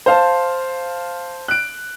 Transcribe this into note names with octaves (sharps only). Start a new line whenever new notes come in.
C5 F5 A5
F#6 D7